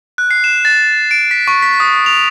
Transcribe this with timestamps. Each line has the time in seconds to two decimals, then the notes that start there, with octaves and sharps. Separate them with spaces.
0.18 F#6
0.31 C7
0.44 E7
0.65 A6
1.11 D7
1.31 B6
1.48 C#6
1.62 B6
1.80 D#6
2.06 F7